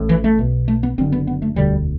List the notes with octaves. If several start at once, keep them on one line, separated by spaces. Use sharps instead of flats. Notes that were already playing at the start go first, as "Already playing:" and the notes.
Already playing: A1 A2
E3
A3
B1 B2
A3
B3
F#1 F#2 D3 C4
B3
B3
A3
E1 D2 D3 G3